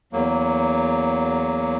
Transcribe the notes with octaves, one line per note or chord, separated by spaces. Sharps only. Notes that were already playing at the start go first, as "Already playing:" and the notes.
E2 F#3 A#3